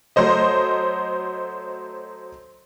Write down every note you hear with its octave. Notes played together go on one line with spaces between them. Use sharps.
F#3 A3 C5 D#5